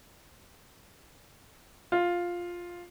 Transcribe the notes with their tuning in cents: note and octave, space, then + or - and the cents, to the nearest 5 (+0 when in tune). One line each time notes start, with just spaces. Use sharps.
F4 +5